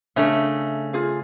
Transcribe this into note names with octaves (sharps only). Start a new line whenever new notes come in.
C#3 A3 D4 E5
F4 G#4 F5